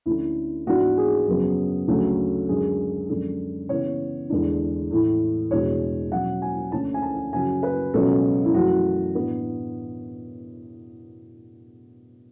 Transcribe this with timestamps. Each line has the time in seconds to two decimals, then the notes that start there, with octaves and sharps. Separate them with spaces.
0.06 D2 D3 A3 C#4 E4
0.66 G#2 E3 B3 D4 F#4
0.97 G#4
1.27 F#2 C#3 F#3 B3
1.88 D2 C#3 F#3 A3
2.48 F#2 D3 G#3 G#4
3.09 F#2 D3 G#3 D4 A4
3.69 C#3 E3 B3 C#5
4.30 E2 D3 G#3 D4
4.91 A2 E3 A3
5.51 E2 B2 G#3 D4 C#5
6.12 B2 F#3 C#4 F#5
6.42 G#5
6.72 D2 D3 A3 C#4 A5
6.94 G#5
7.02 A5
7.33 F#2 C#3 F#3 G#5
7.63 B4
7.94 C#2 B2 F#3 C#4 A4
8.45 E4
8.54 F#2 E3 A3 F#4
9.15 A2 E3 B3 D4